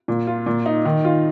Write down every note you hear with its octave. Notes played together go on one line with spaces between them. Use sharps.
A#2
F4
A#2
D#4
D#3
F4